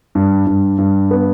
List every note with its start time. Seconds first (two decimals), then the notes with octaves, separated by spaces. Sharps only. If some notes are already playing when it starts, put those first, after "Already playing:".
0.15 G2
0.47 G2
0.78 G2
1.11 B3